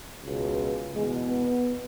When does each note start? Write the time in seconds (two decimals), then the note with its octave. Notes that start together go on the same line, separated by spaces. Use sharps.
0.24 C#2 B2
0.94 E2 B2 G#3
1.29 B3